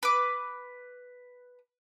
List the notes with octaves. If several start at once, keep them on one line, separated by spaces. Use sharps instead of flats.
B4 D6